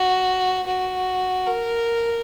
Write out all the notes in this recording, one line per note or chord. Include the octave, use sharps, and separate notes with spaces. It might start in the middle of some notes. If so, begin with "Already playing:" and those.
Already playing: F#4
F#4
A#4